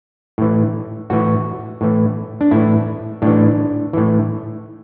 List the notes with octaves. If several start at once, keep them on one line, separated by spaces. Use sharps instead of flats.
A2 E3
A2 E3 F#4
A2 E3
D4
A2 E3 E4
A2 E3 D4
A2 E3